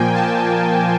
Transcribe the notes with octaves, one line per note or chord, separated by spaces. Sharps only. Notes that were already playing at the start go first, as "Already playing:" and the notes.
Already playing: A#2 F3 A#3 G5 G#5
A5